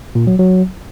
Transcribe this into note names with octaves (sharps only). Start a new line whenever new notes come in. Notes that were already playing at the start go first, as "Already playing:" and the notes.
A#2
F#3
F#3